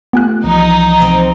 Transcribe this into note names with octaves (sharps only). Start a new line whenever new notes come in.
A3 B3 F4 G4 G#5 F#6
C2 E3 F3 D#4
C3 C4